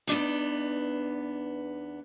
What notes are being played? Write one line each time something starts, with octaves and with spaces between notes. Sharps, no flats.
E2 B3 D4 D#4